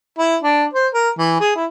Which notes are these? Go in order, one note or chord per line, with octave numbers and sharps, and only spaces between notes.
E4
D4
C5
A#4
E3
G#4
E4